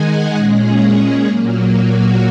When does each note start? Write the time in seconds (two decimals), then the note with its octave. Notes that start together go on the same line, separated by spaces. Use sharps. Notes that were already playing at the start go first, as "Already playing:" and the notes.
Already playing: D#3 G#3 D#4 F#5 G#5
0.35 A#2 G#3 C#4 G#4
1.25 A#2 F#3 A#3
1.70 F#4